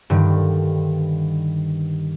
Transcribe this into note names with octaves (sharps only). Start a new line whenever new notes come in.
G2 D3 D#3